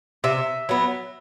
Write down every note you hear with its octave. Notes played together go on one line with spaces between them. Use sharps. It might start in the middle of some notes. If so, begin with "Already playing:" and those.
C3 E5
F#3 B3